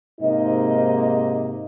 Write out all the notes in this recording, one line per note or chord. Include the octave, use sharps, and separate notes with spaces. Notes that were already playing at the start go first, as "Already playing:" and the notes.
G#2 C3 A#3 D#4 D#5